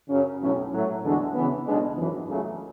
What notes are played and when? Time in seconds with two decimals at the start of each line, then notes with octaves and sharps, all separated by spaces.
0.09 F#2 C#3 F#3 C#4
0.41 B1 A2 F#3 C#4
0.72 A2 F#3 A3
1.03 E2 D3 G#3 D4 F#4
1.35 C#3 E3 B3
1.66 B1 B2 G#3 D4
1.97 G#1 F#2 E3
2.29 C#2 C#3 F#3 A3